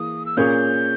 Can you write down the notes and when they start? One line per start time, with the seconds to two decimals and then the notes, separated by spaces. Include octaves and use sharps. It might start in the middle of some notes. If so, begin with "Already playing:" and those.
Already playing: E3 A#3 G#4 D#6
0.26 E6
0.37 A#2 A#3 C#4 G#4 C#5 G6